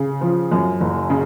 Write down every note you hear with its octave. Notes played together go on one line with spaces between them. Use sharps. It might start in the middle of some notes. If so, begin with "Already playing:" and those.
Already playing: C#3
F3
F#2
F#1
C#3